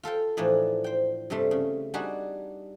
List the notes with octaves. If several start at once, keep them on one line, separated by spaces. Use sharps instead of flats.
F4 A4 F5 G5
A2 E3 F3 D4 D#4
C5 G5
G2 C3 G3 A3 C6
C#3
G3 D4 D#4 F#4 G#4